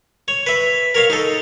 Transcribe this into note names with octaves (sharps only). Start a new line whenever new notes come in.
C#5
B4 E5
A#4 C#5 F5
D#4 A4